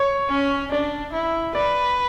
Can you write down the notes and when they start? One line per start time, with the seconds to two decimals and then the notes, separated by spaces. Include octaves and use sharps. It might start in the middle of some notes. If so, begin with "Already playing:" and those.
Already playing: C#5
0.30 C#4
0.72 D4 D5
1.13 E4
1.55 B4 D5